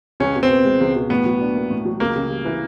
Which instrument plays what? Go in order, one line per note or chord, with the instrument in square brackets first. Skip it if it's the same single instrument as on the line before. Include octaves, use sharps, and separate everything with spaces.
[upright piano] C#2 [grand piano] C#4
[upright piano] B2
[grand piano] C4
[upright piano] B3
G#3
C#2
B2
[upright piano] A2 [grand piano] B3
[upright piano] F#3
D4
A#3
A2
F#3
[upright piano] C#2 [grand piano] A#3
[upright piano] C#3
G3
E3